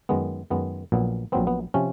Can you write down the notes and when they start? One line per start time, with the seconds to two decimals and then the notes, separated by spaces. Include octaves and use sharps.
0.09 F#2 D#3 G#3 B3
0.50 F#2 D#3 G#3 B3
0.92 A#1 A#2 F#3 B3
1.32 A#1 A#2 F#3 B3 C4
1.47 B3
1.74 C3 F3 C#4